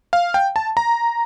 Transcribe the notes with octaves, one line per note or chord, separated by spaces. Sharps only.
F5
G5
A5
A#5